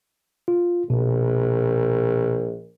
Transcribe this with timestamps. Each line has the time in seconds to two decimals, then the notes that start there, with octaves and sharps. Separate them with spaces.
0.48 F4
0.90 A#1 B2